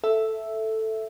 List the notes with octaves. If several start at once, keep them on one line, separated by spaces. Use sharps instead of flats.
A4 E5